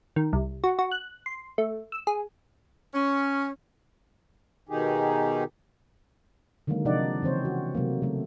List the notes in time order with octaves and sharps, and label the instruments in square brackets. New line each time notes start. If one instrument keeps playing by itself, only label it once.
[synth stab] D#3
C2
F#4
F#4
F#6
C6
A3
E6
G#4
[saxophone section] C#4
[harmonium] B2 D#3 D#4 G4 G#4
[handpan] D3 D#3 F#3 G#3 A#3
C3 F3 D4 D#4 D5 F#5
C#3 E3 C4 C5 C#5
F#4
C3 F#3 A3 A#3
C#3 F#3 A3